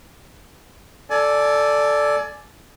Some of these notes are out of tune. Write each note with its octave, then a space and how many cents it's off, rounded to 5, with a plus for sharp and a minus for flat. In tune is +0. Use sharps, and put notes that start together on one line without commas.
A4 +0 D5 +0 G#5 +25